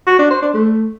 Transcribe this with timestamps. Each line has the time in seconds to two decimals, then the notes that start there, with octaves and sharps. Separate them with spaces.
0.07 F#4
0.19 D4
0.30 C5
0.42 D4
0.54 A3